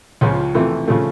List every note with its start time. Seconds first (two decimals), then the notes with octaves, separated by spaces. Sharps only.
0.21 C#2 C#3 F3
0.55 F2 C3 E3 A3
0.87 C#3 F3 A3